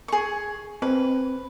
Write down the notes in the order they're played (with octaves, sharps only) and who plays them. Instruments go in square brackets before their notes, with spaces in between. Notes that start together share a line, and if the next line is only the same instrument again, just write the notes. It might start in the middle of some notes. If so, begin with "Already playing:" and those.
[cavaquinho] G#4 C#6
[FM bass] C4 [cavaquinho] B4